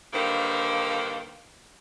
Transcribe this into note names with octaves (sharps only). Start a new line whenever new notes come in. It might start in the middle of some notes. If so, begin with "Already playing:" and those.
G2 D3 D#3 A#3 C5 F5